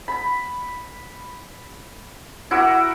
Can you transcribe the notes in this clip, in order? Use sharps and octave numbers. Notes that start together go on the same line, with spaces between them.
B5
E4 F#4 A#4 D6